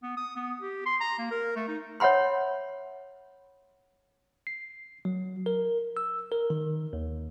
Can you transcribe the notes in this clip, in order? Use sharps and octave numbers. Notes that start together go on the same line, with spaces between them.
B3
D#6
B3
G4
C6
A#5
A#3
A#4
A3
D#4
C#5 E5 F#5 B5 C6
C7
F#3
A#4
E6
A#4
D#3
D#2